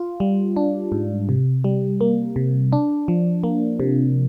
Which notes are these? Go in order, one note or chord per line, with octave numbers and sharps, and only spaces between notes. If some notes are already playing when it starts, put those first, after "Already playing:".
Already playing: F4
G3
D4
G#2
C3
G3
A#3
C3
D4
F3
A#3
C3